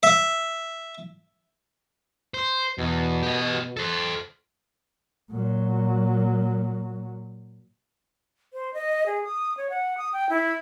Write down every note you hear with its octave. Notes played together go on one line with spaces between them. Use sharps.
E5
C5
E2 B2
G4 D#5
A4 C5
A#2 F#3
C5
D#5
G#4
D#6
C#5
F#5
D#6
G5
E4